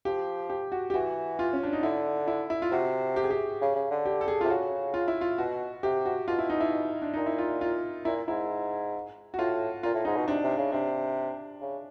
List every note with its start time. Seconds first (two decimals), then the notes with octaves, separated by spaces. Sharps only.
0.05 F3 G4
0.50 G4
0.72 F#4
0.90 G4
0.94 E3 F#4
1.39 F4
1.53 C#4
1.63 D4
1.73 D#4
1.83 D3 E4
2.27 E4
2.50 E4
2.62 F4
2.72 C3 F#4
3.16 G4
3.24 G#4
3.31 G4
3.61 C#3
3.76 C#3
3.90 D3
4.06 G4
4.21 A4
4.28 G#4
4.41 C3 F4
4.50 C#3 F#4
4.94 F4
5.08 E4
5.21 F4
5.38 B2 F#4
5.83 C3 G4
6.06 F#4
6.28 B2 F4
6.39 E4
6.50 D#4
6.60 E4
7.02 D4
7.14 A#2 D#4
7.26 E4
7.38 F4
7.61 F4
8.05 A#2 E4
8.28 G#2 E4
9.34 F#4
9.38 A2 F4
9.83 A#2 F4
9.94 A2
10.05 G#2 D#4
10.17 B2
10.28 C3 D4
10.43 C3
10.58 C#3
10.72 C3 D4
11.61 C#3